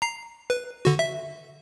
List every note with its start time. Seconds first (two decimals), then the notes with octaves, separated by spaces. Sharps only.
0.02 A#5 C7
0.50 B4
0.85 D3 F#4
0.99 E5